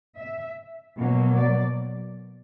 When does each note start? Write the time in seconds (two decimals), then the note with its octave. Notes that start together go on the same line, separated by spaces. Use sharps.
0.19 E5
0.97 B2 F#3 A#3
1.37 D5